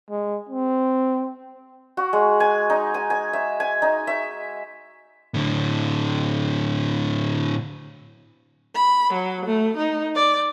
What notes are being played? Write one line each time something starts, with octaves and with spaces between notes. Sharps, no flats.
G#3
C4
F#4
G#3
G#5
D#4
G#5
G#5
E5
G#5
D#4
E5
A2 D3
B5
F#3
A3
D#4
D5